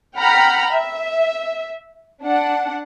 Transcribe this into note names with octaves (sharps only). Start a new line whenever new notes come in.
F#5 G5 A#5 B5 F6
E5
D4 F#5